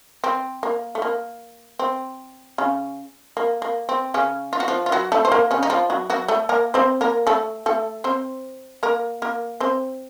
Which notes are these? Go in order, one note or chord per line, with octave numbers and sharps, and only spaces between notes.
C4
A#3
A3
A#3
C4
C#3 C#4
A#3
A#3
C4
C#3 C#4
F4
F#4
F3 F4
F4
F#3 F#4
A3 A4
C5
A#3 A#4
C#3 C#4
D#4
F3 F4
F#3 F#4
F#3 F#4
A3 A4
A#3 A#4
C4 C5
A#3 A#4
A3 A4
A3 A4
C4 C5
A#3 A#4
A#3 A#4
C4 C5